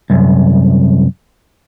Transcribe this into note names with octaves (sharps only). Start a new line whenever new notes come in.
C2 F#2